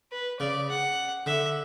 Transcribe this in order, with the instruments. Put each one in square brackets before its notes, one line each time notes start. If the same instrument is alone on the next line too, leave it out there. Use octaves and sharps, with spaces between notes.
[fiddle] B4
[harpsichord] C#3 [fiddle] D5
[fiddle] F#5
[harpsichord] D3 [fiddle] E5